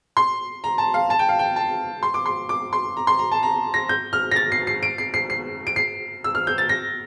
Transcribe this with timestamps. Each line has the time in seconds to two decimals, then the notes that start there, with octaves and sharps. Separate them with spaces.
0.17 C6
0.64 A#5
0.78 A5
0.94 F5
1.10 A5
1.19 G5
1.29 F5
1.39 G5
1.56 A5
2.03 C6
2.14 D6
2.26 C6
2.49 D6
2.73 C6
2.97 A#5
3.07 C6
3.19 A#5
3.32 A5
3.43 A#5
3.74 A#6
3.89 G6
4.13 F6
4.31 A#6
4.36 A6
4.52 C7
4.67 C7
4.83 D7
4.98 C7
5.14 C7
5.30 C7
5.67 D7
5.76 C7
6.24 E6
6.35 F6
6.47 G6
6.58 A6
6.69 A#6